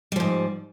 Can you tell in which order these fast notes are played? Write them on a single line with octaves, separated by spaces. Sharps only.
G3 F3 G#2